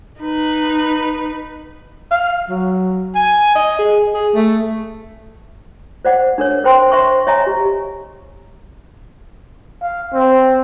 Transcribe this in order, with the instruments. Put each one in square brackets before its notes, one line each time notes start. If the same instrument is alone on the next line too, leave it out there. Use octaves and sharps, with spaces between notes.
[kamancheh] D#4 B4
[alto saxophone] F5
F#3
G#5
D#5
G#4
G#4
A3
[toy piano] C5 D5 F#5
D4 A#4 C#5
B4 C5 G5 C6
C5 E5 C6 C#6
C#5 D#5 E5 G#5 A#5
G4
[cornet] F5
C4